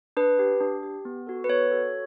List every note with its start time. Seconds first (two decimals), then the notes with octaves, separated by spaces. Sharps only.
0.17 D4 B4
0.39 G4
0.61 D4
0.83 G4
1.05 B3
1.27 F#4 A4
1.44 B4
1.49 B3 C#5
1.71 F#4 A4